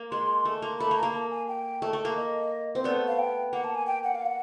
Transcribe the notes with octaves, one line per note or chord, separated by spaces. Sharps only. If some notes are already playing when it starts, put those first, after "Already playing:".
Already playing: A#3
G#3 C6
A3
A#3
A3 B5
A#3
A#5
A#3
A5
G#5
G5
A3
A3
A#3
D#5
C4
A3 B3 D5
F5
G5
A#3 F#5
A5
G#5
G5
F#5
F5
F#5